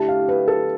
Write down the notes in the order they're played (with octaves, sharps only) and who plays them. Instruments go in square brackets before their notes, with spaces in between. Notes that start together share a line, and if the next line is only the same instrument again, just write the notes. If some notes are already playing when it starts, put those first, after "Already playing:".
Already playing: [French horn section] D3 A3 E4 G4 [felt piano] A5
[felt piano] F5
B4
A4